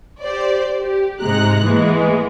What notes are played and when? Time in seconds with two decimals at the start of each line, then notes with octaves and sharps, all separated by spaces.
0.21 G4 C5 D5
0.81 G4
1.20 G#2 C3 G#3 A#5 F#6
1.64 E3 G#3 A#3 B3